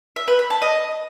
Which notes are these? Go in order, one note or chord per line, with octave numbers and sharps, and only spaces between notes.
E5
B4
B5
A5
D#5